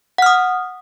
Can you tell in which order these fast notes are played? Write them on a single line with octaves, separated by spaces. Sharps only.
F#5 F6 D#6